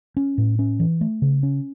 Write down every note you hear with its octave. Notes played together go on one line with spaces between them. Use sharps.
C#4
A2
C#4
E3
A3
C#3
C#4